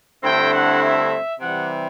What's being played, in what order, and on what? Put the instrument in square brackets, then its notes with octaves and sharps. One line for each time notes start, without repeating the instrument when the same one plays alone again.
[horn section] G2 D3 A3 C4 E4 G5
F#5
E5
C3 E3 G3 F#5